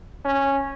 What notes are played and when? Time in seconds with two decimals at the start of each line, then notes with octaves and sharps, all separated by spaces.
0.25 C#4